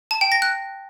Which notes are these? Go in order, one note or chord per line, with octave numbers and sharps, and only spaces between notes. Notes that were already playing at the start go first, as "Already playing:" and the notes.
A5
G5
A#6
F#6